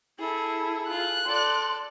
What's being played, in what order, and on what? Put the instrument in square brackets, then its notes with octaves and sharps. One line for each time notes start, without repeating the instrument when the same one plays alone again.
[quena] E4 [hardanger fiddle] G#4 A4
[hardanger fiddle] F4 G#4 [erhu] F#6
[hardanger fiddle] A4 D5 [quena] C6